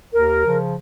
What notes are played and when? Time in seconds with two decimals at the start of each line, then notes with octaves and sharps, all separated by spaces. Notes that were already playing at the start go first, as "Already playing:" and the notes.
0.12 D#2 A#4
0.44 C#3 F3